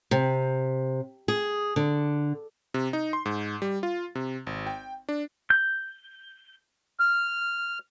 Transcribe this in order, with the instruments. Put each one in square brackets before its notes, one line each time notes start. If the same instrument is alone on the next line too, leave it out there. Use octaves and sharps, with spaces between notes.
[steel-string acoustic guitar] C3
G#4
D3
[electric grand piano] C3
D#4
C6
G#2
G3
F4
C3
G#1
G5
D4
[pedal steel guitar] G6
[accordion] F6